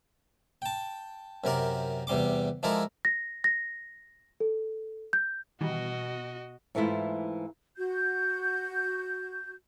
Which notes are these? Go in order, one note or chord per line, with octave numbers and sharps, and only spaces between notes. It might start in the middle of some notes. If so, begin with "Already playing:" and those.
G5 A5
F#2 C3 A#4 D5
E2 C3 G3 C6 D6
F3 G#3 E4 A4 A#4 D5
A#6
A#6
A4
G6
B2 D#3 E3 G3 F#4 D#5
G#2 E3 A3 E4 F4
F#4 G6